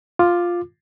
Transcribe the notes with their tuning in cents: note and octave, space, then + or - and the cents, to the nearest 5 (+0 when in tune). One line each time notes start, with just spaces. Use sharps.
F4 +5 D6 +15